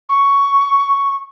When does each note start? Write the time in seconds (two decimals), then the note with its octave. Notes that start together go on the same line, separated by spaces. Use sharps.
0.09 C#6